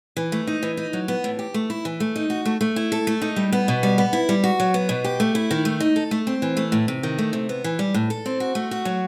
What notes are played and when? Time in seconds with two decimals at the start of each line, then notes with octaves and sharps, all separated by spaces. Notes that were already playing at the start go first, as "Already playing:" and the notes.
0.17 E3
0.32 A3
0.47 D#4
0.63 E3
0.77 D#4
0.93 F#3
1.08 B3
1.24 A2
1.39 G4
1.54 A3
1.70 E4
1.85 E3
2.00 A3
2.16 D#4
2.30 F#4
2.45 A3
2.61 A3
2.76 E4
2.92 A4
3.07 A3
3.22 D#4
3.36 G3
3.52 B3
3.68 B2
3.83 G3
3.98 B3
4.13 E4
4.29 G3
4.44 F#4
4.60 F#3
4.74 B3
4.89 B2
5.04 G4
5.20 A3
5.35 E4
5.51 D#3
5.65 A3
5.80 D#4
5.96 A4
6.11 A3
6.27 C4
6.42 E3
6.57 A3
6.72 A2
6.88 C3
7.03 D#3
7.18 A3
7.33 C3
7.49 B3
7.64 E3
7.79 G3
7.94 A2
8.10 A4
8.26 C4
8.40 F#4
8.55 A3
8.71 F#4
8.85 F#3